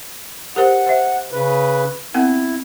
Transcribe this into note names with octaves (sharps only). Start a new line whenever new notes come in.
G4 A#4 C5 F#5
C5 E5
C#3 B4
B3 C4 E4 F#5